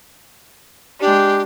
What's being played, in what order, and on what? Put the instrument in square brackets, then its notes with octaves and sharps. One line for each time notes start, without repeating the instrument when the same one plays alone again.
[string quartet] G#3 D4 [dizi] G4